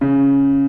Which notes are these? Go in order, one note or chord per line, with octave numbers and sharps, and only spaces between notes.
C#3